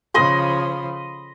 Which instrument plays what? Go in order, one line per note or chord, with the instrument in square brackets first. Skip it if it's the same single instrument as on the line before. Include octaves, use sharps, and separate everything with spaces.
[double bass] C#3 F3 [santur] D#5 B5 C6